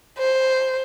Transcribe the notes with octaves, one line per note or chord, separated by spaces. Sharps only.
C5